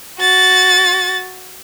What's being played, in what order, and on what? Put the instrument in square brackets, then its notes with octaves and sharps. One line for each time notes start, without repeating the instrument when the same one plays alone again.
[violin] F#4 A6